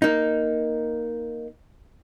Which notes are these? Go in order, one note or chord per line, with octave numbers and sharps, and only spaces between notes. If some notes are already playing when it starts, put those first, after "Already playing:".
A#3 D#4